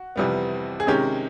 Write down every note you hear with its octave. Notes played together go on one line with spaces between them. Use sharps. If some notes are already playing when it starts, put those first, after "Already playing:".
Already playing: F#4
F2 C3 E3 G3 B3
G#4
C3 D#3 G#3 C#4 G4